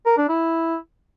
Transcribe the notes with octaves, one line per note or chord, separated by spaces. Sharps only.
A#4
D4
E4